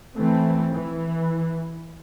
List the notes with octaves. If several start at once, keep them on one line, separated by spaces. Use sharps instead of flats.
E3 A3 C4
E3